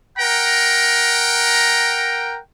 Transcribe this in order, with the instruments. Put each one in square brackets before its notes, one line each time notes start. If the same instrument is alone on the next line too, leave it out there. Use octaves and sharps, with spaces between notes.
[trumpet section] A#4 F#5 G5 A#5